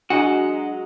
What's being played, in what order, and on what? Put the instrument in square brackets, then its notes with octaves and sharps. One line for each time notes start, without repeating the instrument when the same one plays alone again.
[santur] F#3 G#3 A#5 [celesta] D4 [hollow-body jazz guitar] F#4 [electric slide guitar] D#5 F#5